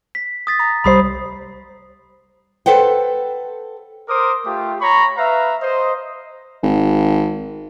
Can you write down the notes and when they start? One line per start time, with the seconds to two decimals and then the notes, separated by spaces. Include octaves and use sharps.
0.15 B6
0.47 D#6 A6 B6
0.59 A#5
0.84 C2 G3 C5 B5 D#6 C7
2.66 A4 B4 C5 F#5 G5
4.09 A#4 C5 D6 D#6
4.46 A3 F4 G4
4.81 C#5 A#5 B5 C#6
5.18 B4 E5 F5 A#5
5.62 C5 D#5
6.63 G#1